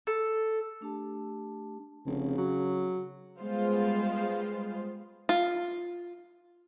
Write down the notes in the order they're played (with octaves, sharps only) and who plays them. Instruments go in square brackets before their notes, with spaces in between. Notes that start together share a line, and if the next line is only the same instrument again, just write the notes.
[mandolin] A4
[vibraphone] A3 D4 G4 A5
[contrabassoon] F1 [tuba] C#3
[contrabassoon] F#3
[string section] G3 G#3 B3 F4 C5
[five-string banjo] F4